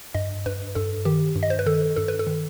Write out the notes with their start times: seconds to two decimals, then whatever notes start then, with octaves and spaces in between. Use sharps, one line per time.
0.15 G2 D#5
0.46 G2 B4
0.75 G2 A4
1.05 D#3 G4
1.36 G2
1.43 D#5
1.50 C5
1.59 B4
1.66 D#3 A4
1.96 G2 A4
2.08 B4
2.19 A4
2.27 D#3